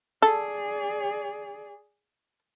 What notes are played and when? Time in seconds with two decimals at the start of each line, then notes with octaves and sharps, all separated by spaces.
0.22 G#4 A4 D5